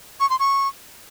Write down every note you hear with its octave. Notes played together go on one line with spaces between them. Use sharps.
C#6
C6
C#6